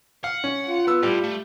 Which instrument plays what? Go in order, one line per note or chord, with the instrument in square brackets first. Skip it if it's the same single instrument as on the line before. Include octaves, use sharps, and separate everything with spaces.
[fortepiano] F5 [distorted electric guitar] F#5
[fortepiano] C#4
[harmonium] F4
[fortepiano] B3 E6
[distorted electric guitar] A2 [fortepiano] G3
[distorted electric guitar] A3